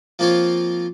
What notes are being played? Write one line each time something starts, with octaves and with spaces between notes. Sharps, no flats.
F3 A#3 C4 F4 C5 C#5